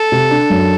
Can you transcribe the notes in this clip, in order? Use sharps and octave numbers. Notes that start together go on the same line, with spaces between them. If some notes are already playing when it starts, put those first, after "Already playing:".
Already playing: A4
C3
D4
F#2